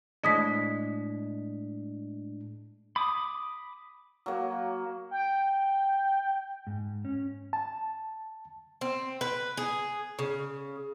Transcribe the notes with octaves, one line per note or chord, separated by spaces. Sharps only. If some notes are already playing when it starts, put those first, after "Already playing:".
A2 G#3 D4 D#5 D#6 B6
B5 D6 D#6
F#3 A#3
G5
G#2
C#4
A5
C4
B4
G#4
C#3